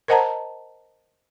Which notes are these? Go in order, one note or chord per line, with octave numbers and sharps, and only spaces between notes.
A#4 C5 D#5 F#5 A5 A#5